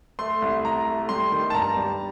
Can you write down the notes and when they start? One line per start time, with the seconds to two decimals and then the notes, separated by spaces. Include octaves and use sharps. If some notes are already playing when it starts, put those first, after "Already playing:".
0.19 A3 C6
0.42 C2
0.65 C2 A#5
0.87 A3
1.09 G3 C6
1.32 D#3
1.50 A5
1.54 G2 A#5
1.77 G3